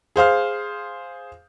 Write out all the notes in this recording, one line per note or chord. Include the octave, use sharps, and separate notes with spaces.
G#4 C5 F5 F6